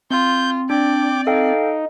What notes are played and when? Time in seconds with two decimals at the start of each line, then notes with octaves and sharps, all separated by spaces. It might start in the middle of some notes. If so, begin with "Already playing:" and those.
0.11 C4 F4 G6
0.70 D4 D5 G5 D6
1.27 D#4 A4 F5 G5